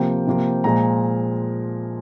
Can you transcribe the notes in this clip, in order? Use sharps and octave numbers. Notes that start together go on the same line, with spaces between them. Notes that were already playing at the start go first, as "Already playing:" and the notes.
Already playing: C3 F3 A#3 G5
C3 F3 A#3
A#2 F3 G#3 A#5